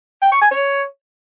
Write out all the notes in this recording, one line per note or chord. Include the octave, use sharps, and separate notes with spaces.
G5
C#6
G#5
C#5